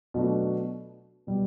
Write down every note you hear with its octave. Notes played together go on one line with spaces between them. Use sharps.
B2 F#3 A3 D4
B2 G3